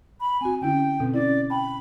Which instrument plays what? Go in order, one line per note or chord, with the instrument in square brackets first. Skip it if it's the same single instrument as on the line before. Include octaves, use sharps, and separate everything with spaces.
[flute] B5
[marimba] C4 F#4 [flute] G#5
[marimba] D3 C#4 E4 [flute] G5
[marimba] B2 C4 A4
[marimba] C#4 E4 [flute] D5
[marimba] G5 A5 [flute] B5